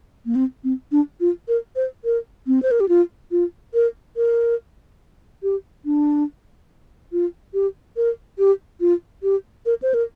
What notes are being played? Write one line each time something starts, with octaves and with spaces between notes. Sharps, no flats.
A#3
C4
C4
D4
F4
A#4
C5
A#4
C4
C5
A#4
G4
F4
F4
A#4
A#4
G4
D4
F4
G4
A#4
G4
F4
G4
A#4
C5
A#4